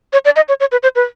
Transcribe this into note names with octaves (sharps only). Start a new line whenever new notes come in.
C#5
D5
D#5
C#5
C#5
B4
C5
B4